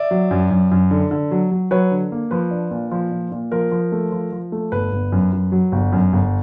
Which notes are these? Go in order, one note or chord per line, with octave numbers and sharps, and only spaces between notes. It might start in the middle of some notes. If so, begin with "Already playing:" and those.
Already playing: D5 E5
F#3
F#2
F#2
F#2
D3
D3
F#3
F#3
F#3 B4 C#5
D3
A#3
F3 B4
D4
A#2
F3
A#2
A#2
F3 A#4
F3
A3
F3
F3
A3
G1 B4
G1
F#2
F#2
F#3
G1
F#2
G1